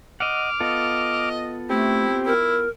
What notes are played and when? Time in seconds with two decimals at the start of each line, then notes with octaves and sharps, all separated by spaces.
0.20 D#5 F#5 D6 F6
0.60 B3 F4 A4 D#5
1.70 A3 C4 E4 G4
2.26 E4 A#4